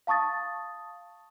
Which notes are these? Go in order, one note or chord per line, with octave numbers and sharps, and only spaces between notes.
F5 A5 C#6 D#6 A6